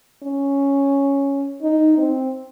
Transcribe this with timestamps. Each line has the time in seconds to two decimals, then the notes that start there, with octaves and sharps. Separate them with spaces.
0.23 C#4
1.63 D#4
1.98 C4